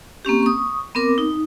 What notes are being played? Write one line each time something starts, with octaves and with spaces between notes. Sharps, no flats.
A#3 C4 C#4 G4
C#6 D#6
B3 C4 A#4 D6
D#4